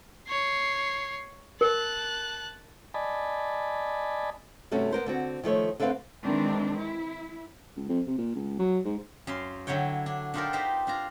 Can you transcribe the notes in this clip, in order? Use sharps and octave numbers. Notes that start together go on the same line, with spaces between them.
C#5 C7
A#4 A5 F#6
D5 D#5 G#5 A5 B5
G2 C3 A3 C#4 F#4
B3 A#4 C5
D3 C4 F#4
D#3 F3 A3 C#5
D3 A3 C4 B4 F5 F#5
D#3 E3 G#3 C4 D4
E4
C#2
F2
C3
A#2
C#2
F#3
G#2
F#2 F5 C6
D3 F#3 E4 C#5 G5
D4
D4 D#4 F4 G4 A4 A#4
D#4 G4 B4 C5 A#5
D4 F4 A#5